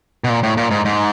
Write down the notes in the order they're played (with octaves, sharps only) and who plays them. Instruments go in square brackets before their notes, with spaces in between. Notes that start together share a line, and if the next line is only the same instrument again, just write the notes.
[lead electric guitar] B2
A#2
A2
A#2
G#2
G#2